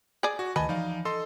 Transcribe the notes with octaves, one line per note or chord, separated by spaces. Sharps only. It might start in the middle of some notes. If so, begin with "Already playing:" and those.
G#4 D5
F#4
D2 D#3 B4 D#5 G#5 A5
E3 F3 D#4 D5 F5
A4 D#5 C6